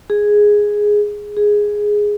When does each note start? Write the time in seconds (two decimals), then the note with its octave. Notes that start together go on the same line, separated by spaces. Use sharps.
0.10 G#4
1.37 G#4